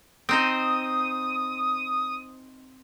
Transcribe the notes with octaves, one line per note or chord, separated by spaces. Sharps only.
C4 D#4 C5 D#6